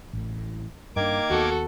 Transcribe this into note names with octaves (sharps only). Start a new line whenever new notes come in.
A1 A2
G2 D#3 A#3 D4 D6 G#6
D#2 B3 F#4 A4